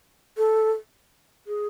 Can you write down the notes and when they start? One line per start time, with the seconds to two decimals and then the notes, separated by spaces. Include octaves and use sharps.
0.37 A4
1.47 G#4